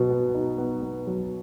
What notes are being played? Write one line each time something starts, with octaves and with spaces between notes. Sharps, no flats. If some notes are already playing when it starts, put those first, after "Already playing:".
Already playing: B2 F#3 B3
B3
D#4
B3
B3
F#3